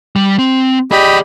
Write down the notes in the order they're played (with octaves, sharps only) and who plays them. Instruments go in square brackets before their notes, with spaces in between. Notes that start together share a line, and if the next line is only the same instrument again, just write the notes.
[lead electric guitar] G3
C4
[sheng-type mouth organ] G4 D#5 B5 [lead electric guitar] G#4 D5